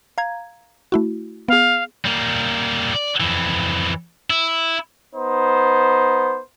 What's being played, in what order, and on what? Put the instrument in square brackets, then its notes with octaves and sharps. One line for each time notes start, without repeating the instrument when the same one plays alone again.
[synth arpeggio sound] F5 A#5 G#6
A3 E4 F#4
[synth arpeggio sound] B3 G#4 [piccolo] F5
[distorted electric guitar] G3 A#3
D5
F2 E3
E4
[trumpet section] B3 D#4 C5